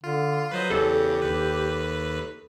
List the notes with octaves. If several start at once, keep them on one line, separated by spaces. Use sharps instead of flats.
D3 F4
F#3 B4 C5 D#5
E2 C#3 G4 A4
D#2 B4